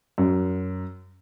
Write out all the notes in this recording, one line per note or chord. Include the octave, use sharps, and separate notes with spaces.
F#2